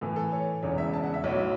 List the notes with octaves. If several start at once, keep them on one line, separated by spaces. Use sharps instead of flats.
A2 E3 A3 A4
A4
C#5
E1 E2 C#3 C#5
E5
A5
F#5
E5
B1 A2 F#3 C#5